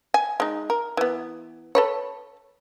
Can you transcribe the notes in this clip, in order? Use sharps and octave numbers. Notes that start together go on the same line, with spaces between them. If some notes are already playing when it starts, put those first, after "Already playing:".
G#5
G#3 D#4
A#4
E3 B3
A4 B4 C#5